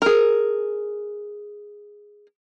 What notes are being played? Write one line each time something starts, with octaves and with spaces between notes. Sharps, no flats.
G#4 A#4